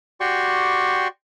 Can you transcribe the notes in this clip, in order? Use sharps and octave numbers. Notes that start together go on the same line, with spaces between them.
F#4 G4 D5 G5 C6 C#6